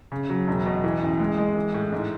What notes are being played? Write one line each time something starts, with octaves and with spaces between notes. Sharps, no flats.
C#3
F#3
E1
B2
E3
A1
G#3
G#3
E3
A2
G#2